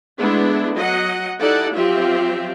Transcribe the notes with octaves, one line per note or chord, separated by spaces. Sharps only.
G#3 A3 B3 D4 E4
F#3 D#5 F#5
D#4 E4 G4 A4 D5 F#5
F3 F#3 C4 F4 G4 E5